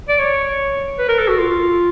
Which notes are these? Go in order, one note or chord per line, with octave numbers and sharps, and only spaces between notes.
D5
C#5
B4
A#4
A4
F#4
F4